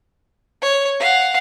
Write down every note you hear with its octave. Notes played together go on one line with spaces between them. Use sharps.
C#5
F5 F#5